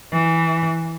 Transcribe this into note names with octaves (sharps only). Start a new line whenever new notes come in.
E3